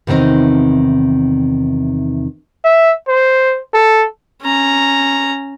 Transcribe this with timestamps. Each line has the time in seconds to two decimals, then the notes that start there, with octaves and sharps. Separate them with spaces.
0.07 E2 C3 D#3 C4 D#4
2.64 E5
3.08 C5
3.74 A4
4.43 C#4 A#5